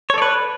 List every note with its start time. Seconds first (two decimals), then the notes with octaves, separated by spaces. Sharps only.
0.10 C#5
0.14 A4
0.18 D5
0.22 B4